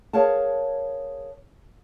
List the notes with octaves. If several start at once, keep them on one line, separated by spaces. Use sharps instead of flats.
G#4 A#4 C#5 F5 F#5 A5